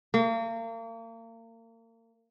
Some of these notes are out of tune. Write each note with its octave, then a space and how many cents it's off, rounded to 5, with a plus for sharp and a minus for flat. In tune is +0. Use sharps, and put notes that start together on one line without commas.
A#3 -35